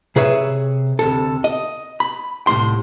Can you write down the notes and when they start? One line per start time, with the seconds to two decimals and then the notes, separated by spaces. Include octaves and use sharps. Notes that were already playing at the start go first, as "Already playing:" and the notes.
0.16 C3 G#4 B4 C#5 E5
0.99 D2 C3 A4
1.44 D#5
2.00 B5
2.47 C2 A2 A3 C6